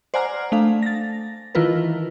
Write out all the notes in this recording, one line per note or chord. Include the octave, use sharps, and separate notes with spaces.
C5 D5 F#5 G#5 A#5 F6
A3 D4 F5
A6 A#6
D#3 E3 E4 F4 A#4 B4